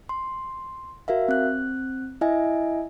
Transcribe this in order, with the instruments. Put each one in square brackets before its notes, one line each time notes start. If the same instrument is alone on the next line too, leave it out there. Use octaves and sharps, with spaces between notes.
[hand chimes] C6
F#4 A#4 E5 F5
C4 F#6
E4 D#5 E5 G#5